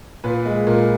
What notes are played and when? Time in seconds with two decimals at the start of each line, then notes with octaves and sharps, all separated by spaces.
0.24 A#2 B4
0.45 G#3
0.67 A#2 A#4